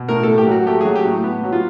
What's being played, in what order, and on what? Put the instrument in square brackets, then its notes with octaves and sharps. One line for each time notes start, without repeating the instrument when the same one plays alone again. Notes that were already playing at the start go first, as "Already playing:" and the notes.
Already playing: [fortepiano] B2
A2 A#4
A2 A4
G4
F#3
F#4
A3 G4
F#3 G#4
G4
A2
B3
F#3
F4